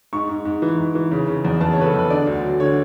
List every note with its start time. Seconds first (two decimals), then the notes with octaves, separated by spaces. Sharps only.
0.13 G#2 C#6
0.29 G#2
0.45 G#2
0.62 E3
0.78 G#2
0.95 E3
1.11 C#3
1.27 C#3
1.45 E2
1.61 E2 A5
1.73 C#5
1.78 C#3 B4
1.85 A4
1.94 E2 B4
2.10 D3 D5
2.27 D2
2.43 F#3
2.60 D3 C#5